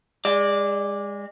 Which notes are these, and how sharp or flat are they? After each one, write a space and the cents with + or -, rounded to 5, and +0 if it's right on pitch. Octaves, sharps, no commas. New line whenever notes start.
G#3 -30 D5 +0